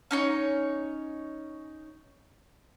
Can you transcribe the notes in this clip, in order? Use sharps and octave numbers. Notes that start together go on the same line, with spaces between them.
C#4 D#4 C#5